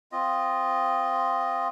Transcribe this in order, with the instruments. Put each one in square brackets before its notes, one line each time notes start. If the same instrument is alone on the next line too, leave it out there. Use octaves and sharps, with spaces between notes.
[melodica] C4 F4 D#5